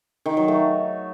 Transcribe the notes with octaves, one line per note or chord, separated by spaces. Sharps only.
D#3
F#3
A3